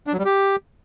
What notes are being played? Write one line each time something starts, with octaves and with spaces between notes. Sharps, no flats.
D4
F#3
G3
G4